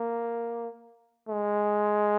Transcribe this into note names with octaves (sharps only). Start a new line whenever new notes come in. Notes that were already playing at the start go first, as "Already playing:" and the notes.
Already playing: A#3
G#3